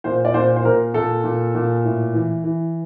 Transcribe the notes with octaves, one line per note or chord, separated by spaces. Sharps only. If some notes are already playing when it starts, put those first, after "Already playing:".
A#2 C5
D5
A#2 C5
C5
A#2 A#4
A#2 A4
A#2
A#2
A2
E3
E3